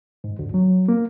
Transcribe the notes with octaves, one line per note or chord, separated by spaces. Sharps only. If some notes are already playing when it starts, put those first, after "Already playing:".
G#2
D2
F#3
A#3